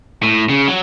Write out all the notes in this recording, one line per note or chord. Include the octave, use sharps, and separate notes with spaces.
A2
C#3
F#3